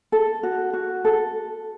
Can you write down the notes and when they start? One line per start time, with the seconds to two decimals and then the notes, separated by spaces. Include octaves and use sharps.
0.12 A4
0.43 F#4
0.73 F#4
1.05 A4